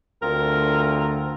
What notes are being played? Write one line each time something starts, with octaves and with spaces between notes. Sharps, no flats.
D2 C4 F4 A#4